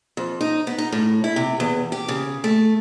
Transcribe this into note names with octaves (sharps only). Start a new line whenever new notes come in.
F2
D#4
B3
D#4
A2
E4
C3
E2
G4
C#3
A3